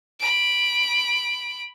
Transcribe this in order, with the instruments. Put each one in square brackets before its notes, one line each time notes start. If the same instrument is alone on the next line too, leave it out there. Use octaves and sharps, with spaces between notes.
[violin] B5 D7